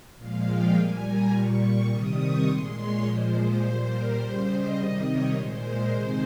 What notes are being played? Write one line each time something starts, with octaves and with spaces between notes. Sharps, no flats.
A#2 F3 G#3 F5
G5
A#2 G3 G#5
A#5
A#2 G3 C#6
C3 D#3 G3 D#6
C#6
A#2 G#3 C6
C#5
A#2 F3 G#3 C5
C5
A#2 G3 C5
A#4
C#3 G3 C5
D#5
C3 D#3 G3
C#5
A#2 G#3 C5
A#4
C3 D#3 G#3 C5